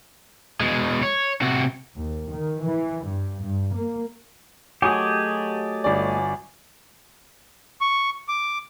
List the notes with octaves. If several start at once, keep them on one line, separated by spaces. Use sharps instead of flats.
B2 G#3
C#5
C3 F#4
D#2
D#3
E3
G2
G2
A#3
F#3 A3 G4 G#4 D#5 G#5 A5 D#6
G1 C#4 D5
C#6
D6